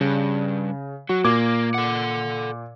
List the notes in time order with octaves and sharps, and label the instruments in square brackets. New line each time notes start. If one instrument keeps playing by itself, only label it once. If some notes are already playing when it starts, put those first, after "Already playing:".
[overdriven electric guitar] G2 [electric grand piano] C#3
[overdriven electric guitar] F#3 [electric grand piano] F#4
[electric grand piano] A#2 D6 G#6 [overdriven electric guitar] A#3
[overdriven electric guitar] A4 F#5